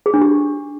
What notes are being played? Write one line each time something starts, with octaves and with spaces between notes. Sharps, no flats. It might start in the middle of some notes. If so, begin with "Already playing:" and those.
G#4
D4
G4